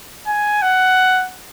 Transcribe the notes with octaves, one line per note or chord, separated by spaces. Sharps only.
G#5
F#5